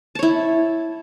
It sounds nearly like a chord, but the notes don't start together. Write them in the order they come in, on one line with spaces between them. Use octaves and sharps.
A5 C#5 E4